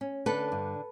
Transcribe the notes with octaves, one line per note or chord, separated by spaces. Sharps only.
C#4
D3 A4 B4
G2